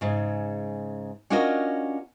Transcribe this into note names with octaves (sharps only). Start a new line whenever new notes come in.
G#2 C#3
C#4 D4 F4 F#4 A#4 D#5